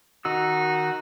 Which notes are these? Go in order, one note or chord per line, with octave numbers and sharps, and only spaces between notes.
D#3 D#4 F#4 E6